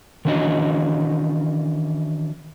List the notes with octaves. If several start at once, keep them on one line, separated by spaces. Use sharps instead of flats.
D#3 E3 C#4 D4 F#4 D#5